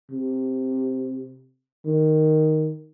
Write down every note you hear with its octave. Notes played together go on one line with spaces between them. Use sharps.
C3
D#3